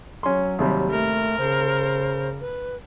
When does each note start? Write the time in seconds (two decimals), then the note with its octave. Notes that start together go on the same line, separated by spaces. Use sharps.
0.23 F#3 C#4 C6
0.59 D#2 C3 G3
0.90 A3 A#4
1.38 C#3 C5
2.41 B4